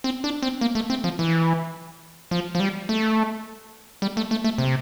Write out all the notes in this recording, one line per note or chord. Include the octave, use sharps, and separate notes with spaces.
C4
D4
C4
A#3
A3
C4
F3
E3
F3
F3
G3
A3
G3
A3
A3
A3
C3